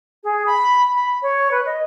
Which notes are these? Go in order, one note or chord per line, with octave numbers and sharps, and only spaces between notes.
G#4
B5
B5
C#5
B4
D#5